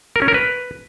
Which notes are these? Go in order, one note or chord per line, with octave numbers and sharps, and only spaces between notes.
A#4
C#4
A#4
B4